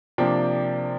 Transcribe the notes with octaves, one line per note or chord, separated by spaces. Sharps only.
C3 F3 A#3 D4 G5